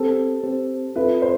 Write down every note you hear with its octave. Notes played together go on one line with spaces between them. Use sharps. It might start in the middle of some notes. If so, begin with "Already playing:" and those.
Already playing: C4 G4 A4 C5
C4 G4 C5
C4 F4 A4 B4 E5
C5